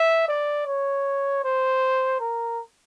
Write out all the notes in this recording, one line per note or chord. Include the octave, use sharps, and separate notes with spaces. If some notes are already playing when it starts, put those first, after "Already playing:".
Already playing: E5
D5
C#5
C5
A#4